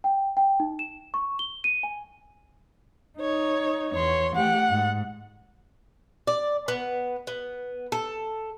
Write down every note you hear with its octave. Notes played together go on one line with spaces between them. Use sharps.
G5
G5
D#4
E7
C#6
G7
D#7
G#5
D#4 C#5
E2 C#5 C6
A3 G4 F#5
G#2
D5
B3
B3
A4